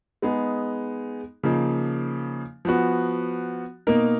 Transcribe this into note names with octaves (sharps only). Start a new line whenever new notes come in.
G#3 B3 D#4 G#4
C#3 F3 A#3 D#4
F3 B3 F#4
B2 A#3 D#4 A#4